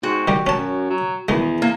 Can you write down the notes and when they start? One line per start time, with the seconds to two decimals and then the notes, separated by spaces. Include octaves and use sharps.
0.03 G#2 F#4 G5
0.28 D#3 G3 G4
0.47 F#2 C#4 A5
0.90 F#3
1.28 E2 D#3 G#3
1.62 A#3